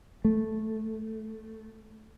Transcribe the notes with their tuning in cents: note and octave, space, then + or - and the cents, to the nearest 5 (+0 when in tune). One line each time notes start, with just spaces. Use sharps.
A3 -5